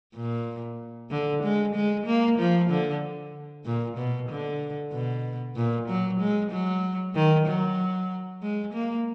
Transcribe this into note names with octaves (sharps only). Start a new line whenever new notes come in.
A#2
D3
G#3
G#3
A#3
F3
D3
A#2
B2
D3
B2
A#2
F#3
G#3
F#3
D#3
F#3
G#3
A#3